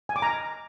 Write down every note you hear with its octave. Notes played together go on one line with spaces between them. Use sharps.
G#5
D6
A#5